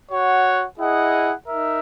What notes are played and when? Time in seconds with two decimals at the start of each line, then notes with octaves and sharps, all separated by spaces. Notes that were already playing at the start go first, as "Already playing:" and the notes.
0.11 F#4 C#5 F#5
0.78 E4 G#4 D#5 F#5
1.45 D#4 A#4 E5